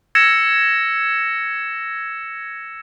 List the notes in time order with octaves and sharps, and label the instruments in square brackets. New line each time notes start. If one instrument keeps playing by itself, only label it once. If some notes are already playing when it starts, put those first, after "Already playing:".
[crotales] E6 G#6 A#6 C#7 E7